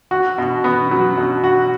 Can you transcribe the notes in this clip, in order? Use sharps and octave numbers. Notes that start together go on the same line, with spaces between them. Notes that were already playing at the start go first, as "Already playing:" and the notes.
F#4
B2
B3
F#3
B2
F#4